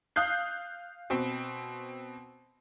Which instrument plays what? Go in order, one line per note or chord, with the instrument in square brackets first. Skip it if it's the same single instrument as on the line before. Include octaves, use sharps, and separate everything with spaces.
[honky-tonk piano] F5 D#6 F#6 G6 C7
B2 C4